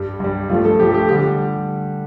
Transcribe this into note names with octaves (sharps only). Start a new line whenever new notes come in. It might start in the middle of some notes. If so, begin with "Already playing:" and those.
Already playing: G2 G3
G2 G3
G2 F3 A3 F4
A4
G2 F3 A3 G4
A4
G4
D3 G3 G4